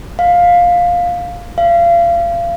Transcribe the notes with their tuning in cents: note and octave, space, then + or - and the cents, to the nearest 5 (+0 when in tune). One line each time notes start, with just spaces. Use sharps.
F5 +10
F5 -30